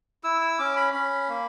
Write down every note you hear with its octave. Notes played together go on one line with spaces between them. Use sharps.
E4 E6
E6
C#4 D6
B5
C#4 B5
A#3